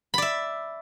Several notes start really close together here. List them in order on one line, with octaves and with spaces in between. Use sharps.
B5 D5 E5